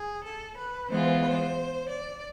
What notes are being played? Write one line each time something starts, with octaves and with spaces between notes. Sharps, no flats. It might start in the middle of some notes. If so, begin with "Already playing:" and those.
Already playing: G#4
A4
B4
E3 G#3 B3 F4 C5
C5
D5